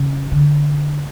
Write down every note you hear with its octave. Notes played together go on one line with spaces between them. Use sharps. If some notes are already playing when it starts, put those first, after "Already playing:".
Already playing: C#3
D3